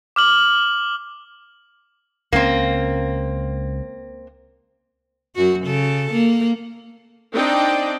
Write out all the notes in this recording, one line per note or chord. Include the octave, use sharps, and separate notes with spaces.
D6 F6 F#7
C#2 A#3 C4 C#4
F#2 F#4
C#3 A4
A#3
C4 D4 D#4 D5 D#5 G5